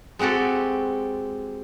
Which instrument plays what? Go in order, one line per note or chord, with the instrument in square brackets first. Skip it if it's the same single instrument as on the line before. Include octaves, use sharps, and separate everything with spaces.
[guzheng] G#3 C4 F#4 G4 A4